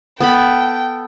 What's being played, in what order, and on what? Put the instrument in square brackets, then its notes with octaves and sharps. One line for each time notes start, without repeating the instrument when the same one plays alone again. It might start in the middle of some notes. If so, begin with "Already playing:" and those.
[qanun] B3 A4 B5 [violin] G5